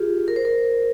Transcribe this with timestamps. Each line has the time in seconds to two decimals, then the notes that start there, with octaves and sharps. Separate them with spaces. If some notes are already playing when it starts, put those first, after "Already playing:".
Already playing: F4 G4 G#4
0.28 A#4
0.36 C5
0.45 A#4